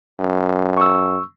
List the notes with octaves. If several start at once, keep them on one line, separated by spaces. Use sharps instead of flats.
F#2
C#6 E6